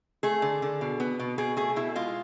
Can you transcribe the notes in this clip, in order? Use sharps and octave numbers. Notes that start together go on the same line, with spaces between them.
A3 G#4
D3
D3
B2
B3
B2
B2 G#4
A3 G#4
B2 E4
G#3 F4